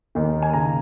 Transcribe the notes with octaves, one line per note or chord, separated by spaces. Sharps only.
D#2 D#3
G#5
C#3 A#5